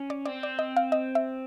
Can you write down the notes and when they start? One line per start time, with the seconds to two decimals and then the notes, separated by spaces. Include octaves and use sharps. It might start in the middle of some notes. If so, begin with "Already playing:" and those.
Already playing: C#4
0.10 D5
0.25 C4 D5
0.43 D5
0.59 D#5
0.77 F5
0.92 D#5
1.15 E5